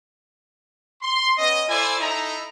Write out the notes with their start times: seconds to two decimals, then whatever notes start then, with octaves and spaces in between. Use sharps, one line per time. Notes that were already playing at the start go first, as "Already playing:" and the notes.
1.02 C6
1.38 B3 C#4 D#5
1.69 E4 A4 C5 D5 G#5
2.00 D#4 E4 A4 A#5